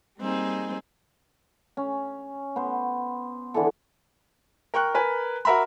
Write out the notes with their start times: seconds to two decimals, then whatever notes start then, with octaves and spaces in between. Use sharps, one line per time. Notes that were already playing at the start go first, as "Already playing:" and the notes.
0.19 G3 A#3 C4 D#4 G#4
1.77 C#4
2.56 B3 C5
3.54 D3 E3 G#4 A4
4.74 A#4 G5 C#6 F#6
4.94 A#4 B4 G#5
5.45 F#4 A#4 E5 A#5 B5